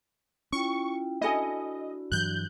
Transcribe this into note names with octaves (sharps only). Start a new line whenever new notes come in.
C#4 E4 F4 G5 C#6
D4 E4 F#4 A4 D5 D#5 G#5
G2 E3 F#3 F#6 G6